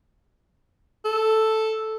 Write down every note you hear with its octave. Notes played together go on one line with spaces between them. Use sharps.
A4